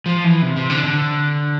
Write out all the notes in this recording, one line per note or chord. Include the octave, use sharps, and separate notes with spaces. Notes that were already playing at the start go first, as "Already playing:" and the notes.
F3
E3
C3
C3
D3
D3